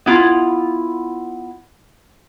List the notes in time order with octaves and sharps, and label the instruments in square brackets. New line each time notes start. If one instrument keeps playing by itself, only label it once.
[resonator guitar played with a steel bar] B3 E4 F4